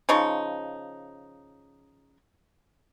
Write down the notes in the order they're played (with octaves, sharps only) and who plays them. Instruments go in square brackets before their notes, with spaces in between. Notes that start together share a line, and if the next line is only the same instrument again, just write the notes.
[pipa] C#3 F3 D#4 C#6